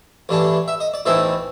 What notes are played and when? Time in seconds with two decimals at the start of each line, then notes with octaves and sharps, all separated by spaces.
0.29 A1 G2 E3 A3 D4
0.68 E5
0.80 D#5
0.94 D5
1.05 B1 A2 E3 A3 C4 E5